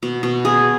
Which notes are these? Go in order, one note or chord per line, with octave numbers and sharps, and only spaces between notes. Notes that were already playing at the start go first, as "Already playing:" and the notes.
B2
B2
G#4